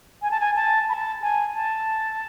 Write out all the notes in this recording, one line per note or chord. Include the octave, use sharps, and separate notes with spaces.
G#5
A5
G#5
A5
B5
A5
G#5
A5